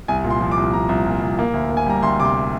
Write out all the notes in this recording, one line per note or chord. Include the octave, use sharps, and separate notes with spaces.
C2 G#5
A#2
C6
F3
D6
C2
F3 A#5
C2
A#2
C2
A#3
D2
A#3
G#5
G3 A#5
D2 C6
C3 D6
C6